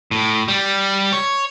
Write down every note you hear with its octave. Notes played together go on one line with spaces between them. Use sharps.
A2
G3
C#5